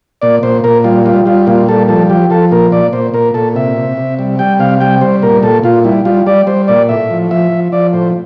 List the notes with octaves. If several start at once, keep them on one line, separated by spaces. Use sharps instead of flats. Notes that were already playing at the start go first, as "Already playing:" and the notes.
A#2 D5
A#2 C5
A#2 A#4
G3 F4
G3 F4
G3 F4
A#2 F4
G3 A4
F3 A4
F3 G4
F3 A4
A#2 A#4
A#2 D5
A#2 C5
A#2 A#4
A#2 A4
C3 E5
C3
C3
G3
G3 G5
C3 F5
G3 G5
G3 C5
A#2 A#4
A#2 A4
A#2 F4
G3 E4
G3 F4
G3 D5
G3 C5
A#2 D5
A2 E5
F3
F3 E5
F3
F3 D5
A2 C5